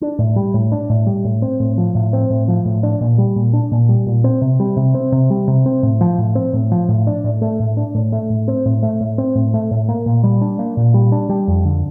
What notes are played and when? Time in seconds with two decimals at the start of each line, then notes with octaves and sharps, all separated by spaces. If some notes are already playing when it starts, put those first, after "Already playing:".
0.01 D4
0.19 A2
0.36 G3
0.54 A2
0.72 D4
0.90 A2
1.07 G3
1.25 A2
1.42 C4
1.60 A2
1.78 F3
1.95 A2
2.13 C4
2.30 A2
2.48 F3
2.65 A2
2.83 D4
3.01 A#2
3.18 G3
3.36 A#2
3.53 D4
3.72 A#2
3.89 G3
4.06 A#2
4.24 C4
4.42 C3
4.60 G3
4.77 C3
4.94 C4
5.12 C3
5.30 G3
5.48 C3
5.66 C4
5.83 A2
6.01 F3
6.18 A2
6.35 C4
6.53 A2
6.72 F3
6.89 A2
7.07 D4
7.24 A2
7.42 A3
7.60 A2
7.77 D4
7.95 A2
8.12 A3
8.30 A2
8.48 C4
8.66 A2
8.83 A3
9.01 A2
9.18 C4
9.35 A2
9.54 A3
9.71 A2
9.89 A#3
10.06 A#2
10.24 G3
10.41 D4
10.59 A#3
10.77 A#2
10.94 G3
11.12 D4
11.29 G3
11.48 F2
11.65 D3